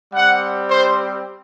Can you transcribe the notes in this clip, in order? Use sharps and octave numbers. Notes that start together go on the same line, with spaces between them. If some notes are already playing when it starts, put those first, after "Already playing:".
G3 C4 G4 F#5
C5